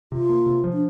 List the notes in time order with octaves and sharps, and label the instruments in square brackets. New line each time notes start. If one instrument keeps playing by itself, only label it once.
[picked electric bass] C3 [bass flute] F4
[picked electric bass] A#3
C3
F3
[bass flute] D4